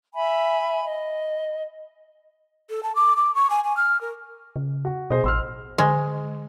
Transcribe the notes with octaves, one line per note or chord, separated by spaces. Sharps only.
E5 G#5 B5
D#5
A4
A5
D6
D6
C#6
G#5
G#5
F6
A#4
C#3
F#4
B2 G#4 C5 D#5
A1 C6 E6 F6
D3 G#3